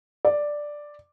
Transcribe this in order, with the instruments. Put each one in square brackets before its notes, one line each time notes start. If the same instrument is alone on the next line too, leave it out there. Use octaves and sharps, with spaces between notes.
[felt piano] D5